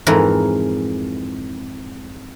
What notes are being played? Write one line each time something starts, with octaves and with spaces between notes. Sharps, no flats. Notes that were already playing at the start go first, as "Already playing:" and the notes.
F2 G#2 E3 A#4 A#5